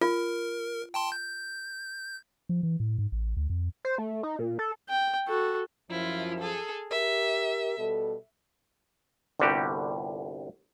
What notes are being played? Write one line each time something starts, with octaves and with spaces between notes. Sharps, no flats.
F4 A#4
G5 A5 C6
G6
F3
E3
A2
G#2
A1
D2
F2
C5
A3
D#4
A#2
A4
G5
F#4 A4
F#2 F3 E4 F4
G#4 A4
G4 A#4 E5
B2 G3 A4
G1 C2 D3 G3 F#4 G4